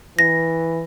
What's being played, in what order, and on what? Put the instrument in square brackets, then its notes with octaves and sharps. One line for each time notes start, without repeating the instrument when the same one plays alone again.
[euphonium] E3 [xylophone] A#6